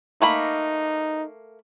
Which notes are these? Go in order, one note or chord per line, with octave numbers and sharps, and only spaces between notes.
A3 A#3 D#4 B5